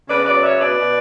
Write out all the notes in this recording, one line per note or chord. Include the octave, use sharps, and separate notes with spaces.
C#3 B4 D5
F#3 B4 D5
C#3 C#5 E5
B2 B4 D5
B2